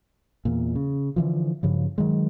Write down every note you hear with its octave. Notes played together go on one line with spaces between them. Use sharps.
E2 A#2
C#3
D3 E3 F3
G2 C#3 F3
D#3 F#3 G#3